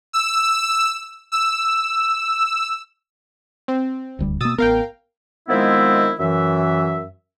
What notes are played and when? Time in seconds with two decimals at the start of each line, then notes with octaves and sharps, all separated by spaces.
0.13 E6
1.32 E6
3.68 C4
4.19 D#1 D2 G3
4.40 B2 A#3 D#6 E6 A6
4.58 A1 B3 A#4 F5 G5
5.49 D#3 F3 G#3 B3 C4 E4
6.20 F#2 E3 E5